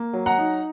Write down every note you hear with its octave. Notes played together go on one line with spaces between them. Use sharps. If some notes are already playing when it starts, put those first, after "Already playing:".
Already playing: A#3
F#3
F#5 A#5
D#4